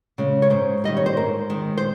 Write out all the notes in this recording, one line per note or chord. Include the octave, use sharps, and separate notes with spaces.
C#3 G#3
C#5
G#2 C5
D#3 G3 D#5
C#5
C5
G#2 A#4
D#3 G#3
C5